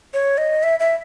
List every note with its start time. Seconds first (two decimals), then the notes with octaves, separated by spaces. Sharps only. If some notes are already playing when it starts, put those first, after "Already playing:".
0.14 C#5
0.38 D#5
0.63 E5
0.80 E5